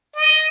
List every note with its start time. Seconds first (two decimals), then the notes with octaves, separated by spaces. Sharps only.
0.16 D#5